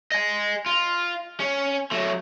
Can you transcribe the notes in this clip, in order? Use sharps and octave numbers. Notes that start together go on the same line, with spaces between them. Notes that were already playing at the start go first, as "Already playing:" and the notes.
D#5 G#5
F4
C#4
F#3 A3